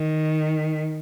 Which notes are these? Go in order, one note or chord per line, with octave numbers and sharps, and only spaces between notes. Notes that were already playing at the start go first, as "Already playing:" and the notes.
Already playing: D#3